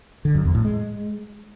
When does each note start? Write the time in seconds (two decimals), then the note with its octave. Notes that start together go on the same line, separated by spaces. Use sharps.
0.25 D3
0.35 F#2
0.45 E2
0.55 A2
0.65 G#3